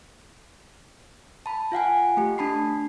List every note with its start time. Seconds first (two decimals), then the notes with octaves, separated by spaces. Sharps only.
1.46 A5 B5
1.72 F4 F5 F#5 G#5
2.17 A3 G4
2.38 D4 A5 B5 C7